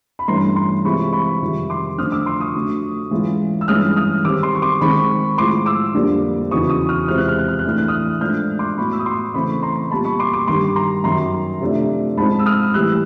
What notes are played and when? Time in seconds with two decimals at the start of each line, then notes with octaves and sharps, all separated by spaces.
0.19 B5
0.28 G2 E3 A3 C#4 A#5 C6
0.56 A#5 C6
0.84 C3 E3 G#3 C4 F4 B5 C#6
1.13 B5 C#6
1.42 F2 C3 D#3 G3
1.70 C6 D6
1.98 F2 D3 F3 A3 D#6 F6
2.12 D6 E6
2.26 C6 D6
2.41 C#6 D#6
2.54 D3 F#3 A3
3.11 G#2 E3 G#3 C#4 F4
3.61 E6
3.68 G2 E3 G#3 C#4 F4 D#6 F6
3.96 D#6 F6
4.24 D#3 G3 C4 D6 E6
4.43 C6 D6
4.55 C#6
4.62 C6 D6
4.81 D#3 G#3 C4 D#4 B5 C#6
5.38 A2 F3 G#3 C6 D6
5.66 D6 E6
5.94 F2 D3 G3 A#3 D4
6.51 E2 C#3 F#3 B3 D#4 C#6 D#6
6.70 C#6 D#6
6.89 D#6 F6
7.07 E2 C3 F3 G#3 C4 F6
7.18 F#6
7.28 F6
7.38 F#6
7.48 F6
7.59 F#6
7.64 A2 E3 A3 D4 F6
7.78 F#6
7.88 D#6 F6
8.21 G#2 F3 A3 D4 F6 G6
8.59 C6 D6
8.77 A2 F#3 B3 E4 B5 C#6
8.92 E6
8.99 D#6
9.06 C6 D6
9.34 C#3 E3 A3 C4 B5 C#6
9.63 A#5 C6
9.91 A#2 G3 B3 A5 B5
10.05 B5 C#6
10.19 C6 D6
10.33 C6 D6
10.47 G2 D#3 G3 C6 D6
10.76 A#5 C6
11.04 F#2 D#3 F#3 A#5 C6
11.61 C3 F3 A3 D4
12.17 G#2 F3 G#3 C4 D#4 A5 B5
12.39 E6
12.46 D#6 F6
12.74 A2 E3 G3 E6 F#6